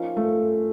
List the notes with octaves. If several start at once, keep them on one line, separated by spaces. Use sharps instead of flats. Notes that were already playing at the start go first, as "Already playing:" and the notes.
Already playing: F3 A#3 C#4 D#4 F4
A3